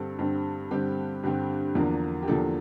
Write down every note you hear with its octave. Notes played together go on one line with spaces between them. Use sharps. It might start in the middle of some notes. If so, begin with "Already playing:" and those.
Already playing: G2 D3 G3 C4 A4
G2 D3 G3 C4
G2 D3 G3 C4 G4
G2 D3 G3 C4
E2 D3 F3 A#3 D4
G4
E2 D3 F3 A#3 D4 A4